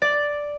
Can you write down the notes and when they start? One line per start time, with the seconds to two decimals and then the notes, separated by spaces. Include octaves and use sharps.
0.02 D5